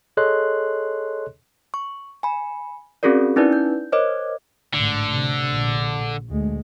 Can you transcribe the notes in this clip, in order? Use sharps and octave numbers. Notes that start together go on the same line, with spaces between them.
G#4 A4 C#5 D#5 C6 F#6
C#6
G#5 B5
C4 C#4 F#4 G#4 A#4 D5
C#4 D#4 E4 B4 D5
G6
A#4 C5 C#5 D#5 D6
A1 G#2 D3
C3
A#1
D2 G#3